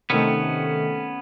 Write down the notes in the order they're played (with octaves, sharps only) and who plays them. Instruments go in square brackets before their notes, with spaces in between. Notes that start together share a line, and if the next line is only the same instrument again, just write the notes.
[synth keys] C3 D#3 A3 [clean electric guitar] B3 C#4